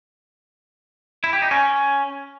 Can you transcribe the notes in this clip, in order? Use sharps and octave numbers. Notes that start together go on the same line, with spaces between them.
E4
G4
D#4
C#4